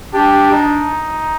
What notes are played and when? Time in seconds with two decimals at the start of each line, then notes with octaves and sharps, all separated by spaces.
0.14 D4 G4
0.52 D#4